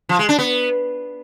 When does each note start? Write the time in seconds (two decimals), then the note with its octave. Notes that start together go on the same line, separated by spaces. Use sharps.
0.09 F3
0.19 G#3
0.29 D4
0.39 B3